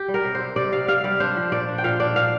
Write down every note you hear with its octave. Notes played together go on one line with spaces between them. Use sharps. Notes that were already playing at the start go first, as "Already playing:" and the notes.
Already playing: G4
G3
A#4
C3
C5
C3
C3 D5
C3 F5
C3 F5
G3 D5
D4 C5
F3
A#2 D5
D4
G5
A#2 F5
D4 D5
A#2 F5